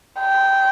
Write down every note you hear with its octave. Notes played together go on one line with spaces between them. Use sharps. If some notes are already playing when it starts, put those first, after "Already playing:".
G5